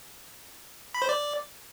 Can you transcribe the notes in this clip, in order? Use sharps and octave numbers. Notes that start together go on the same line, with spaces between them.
B5
C5
D5